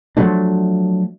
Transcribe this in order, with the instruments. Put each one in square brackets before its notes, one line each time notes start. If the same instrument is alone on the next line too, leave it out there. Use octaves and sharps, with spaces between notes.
[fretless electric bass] F3 F#3 A3 D4